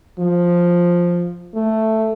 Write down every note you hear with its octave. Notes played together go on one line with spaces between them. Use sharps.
F3
A3